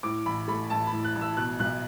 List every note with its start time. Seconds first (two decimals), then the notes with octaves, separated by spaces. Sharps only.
0.03 A2 D6
0.26 A1 B5
0.48 A3 B5
0.70 A1 A5
0.87 B5
0.93 A2
1.05 F#6
1.16 A1
1.21 E6
1.37 B2 F#6
1.60 B1 F#6